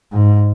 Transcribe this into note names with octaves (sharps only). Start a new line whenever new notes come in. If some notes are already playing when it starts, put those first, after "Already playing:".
G#2